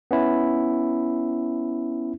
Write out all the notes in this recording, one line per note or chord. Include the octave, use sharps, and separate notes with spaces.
B3 C#4 E4